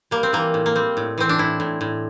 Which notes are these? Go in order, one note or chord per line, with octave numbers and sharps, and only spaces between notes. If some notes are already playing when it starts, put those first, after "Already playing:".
G3 A#3
C4
E3 A#3
A2
A#3
G3 C4
A2
E3 C4
D4
A2 E4
A2
A2